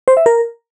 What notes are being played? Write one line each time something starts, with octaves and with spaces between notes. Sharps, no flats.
C5
E5
A#4